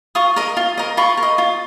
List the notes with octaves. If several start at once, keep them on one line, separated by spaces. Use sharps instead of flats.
F4 C#6 D#6
A#4 D#5
F4
A#4 D#5
F4 B5 C#6
A#4
D#5
F4